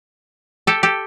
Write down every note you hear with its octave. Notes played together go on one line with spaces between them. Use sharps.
G4 A4
G4 A4